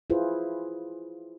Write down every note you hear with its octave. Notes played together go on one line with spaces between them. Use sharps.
E4 F4 G#4 B4 C5